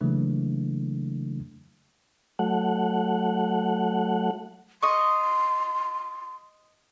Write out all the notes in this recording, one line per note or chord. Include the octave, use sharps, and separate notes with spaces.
C#3 E3 F#3 A3 A#3 D4
F#3 A3 F#5
D#5 C6 C#6